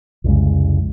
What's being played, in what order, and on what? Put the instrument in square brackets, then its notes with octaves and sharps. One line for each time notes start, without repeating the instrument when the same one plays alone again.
[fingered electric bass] C2 F2 C#3 G#3